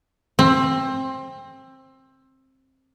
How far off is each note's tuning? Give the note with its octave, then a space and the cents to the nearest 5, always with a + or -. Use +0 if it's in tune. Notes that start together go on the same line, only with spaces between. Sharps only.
C4 +20